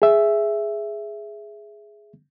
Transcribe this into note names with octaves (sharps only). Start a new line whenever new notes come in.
G#4 E5